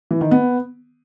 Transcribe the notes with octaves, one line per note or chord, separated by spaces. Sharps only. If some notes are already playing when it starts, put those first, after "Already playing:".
E3
D#3
B3